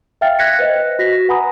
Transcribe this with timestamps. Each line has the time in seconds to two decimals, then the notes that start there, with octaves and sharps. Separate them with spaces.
0.21 E5 F5 G5 F6 A6
0.39 F#6 G#6 A#6 B6 C#7
0.59 B4 C5 D#5
0.99 F#4 A#6 B6
1.28 B4 F#5 G#5 A#5 B5 D#6